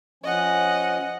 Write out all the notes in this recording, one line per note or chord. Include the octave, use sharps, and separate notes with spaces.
F3 C#4 D#5 F#5